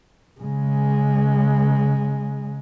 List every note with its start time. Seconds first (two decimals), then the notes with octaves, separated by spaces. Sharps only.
0.41 C#3 G#3